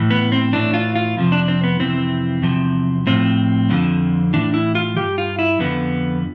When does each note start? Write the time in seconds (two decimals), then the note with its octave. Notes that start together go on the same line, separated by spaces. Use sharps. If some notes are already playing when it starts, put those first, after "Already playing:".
Already playing: A2 E3
0.11 B3
0.32 C4
0.53 A2 E3 D4
0.74 F4
0.95 F4
1.16 F2 C3 F3
1.32 D4
1.48 C4
1.64 B3
1.80 F2 C3 E3 C4
2.43 E2 C3 F3
3.07 A2 F3 C4
3.70 F2 D3 F3
4.33 A2 E3 D4
4.54 E4
4.75 F4
4.97 G2 E3 G4
5.18 F4
5.39 E4
5.59 F2 D3 F3 B3